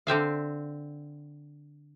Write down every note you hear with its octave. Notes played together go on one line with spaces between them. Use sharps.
D3 C4 E5 F5